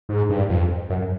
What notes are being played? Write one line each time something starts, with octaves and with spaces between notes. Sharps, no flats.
G#2
G2
F2
F#2